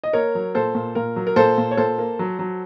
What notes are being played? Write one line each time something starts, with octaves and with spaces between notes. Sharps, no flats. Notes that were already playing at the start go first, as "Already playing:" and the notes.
D#5
A#3 A#4 C#5
F#3
A#2 A4 C5
A#2
A#2 A#4
F#3
A#4
A#2 A4 C5
A#2
C#5
A#2 A4 C5
A#3
F#3
F#3